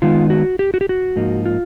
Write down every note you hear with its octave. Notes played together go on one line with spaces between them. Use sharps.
D#3 G#3 B3 D#4 F4
F#4
G4
F#4
G4
F#4
G#2 F3 A#3 D#4
F4